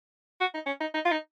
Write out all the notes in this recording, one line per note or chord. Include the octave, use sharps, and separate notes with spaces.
F#4
D#4
C#4
D#4
D#4
F4
D#4